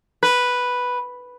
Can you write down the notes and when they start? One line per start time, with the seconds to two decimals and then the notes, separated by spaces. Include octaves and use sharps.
0.23 B4